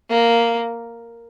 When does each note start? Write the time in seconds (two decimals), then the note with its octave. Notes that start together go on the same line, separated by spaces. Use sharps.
0.10 A#3